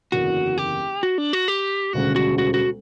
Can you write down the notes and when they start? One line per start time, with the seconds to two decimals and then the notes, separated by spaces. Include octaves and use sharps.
0.12 F#1 E2 D3 A#3 C#4 F#4
0.58 G4
1.03 F#4
1.18 D4
1.33 F#4
1.48 G4
1.93 E1 D2 C#3 G3 F#4
2.16 F#4
2.38 F#4
2.54 F#4